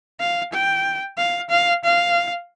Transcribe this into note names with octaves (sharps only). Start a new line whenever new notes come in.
F5
G5
F5
F5
F5